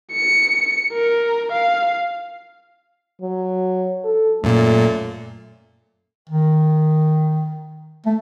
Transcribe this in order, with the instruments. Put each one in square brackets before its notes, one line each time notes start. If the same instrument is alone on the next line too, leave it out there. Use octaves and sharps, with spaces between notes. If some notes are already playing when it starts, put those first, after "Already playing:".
[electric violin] C#7
A#4
F5
[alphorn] F#3
A4
[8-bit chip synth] F#2 A#2 [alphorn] A3
[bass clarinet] D#3
A3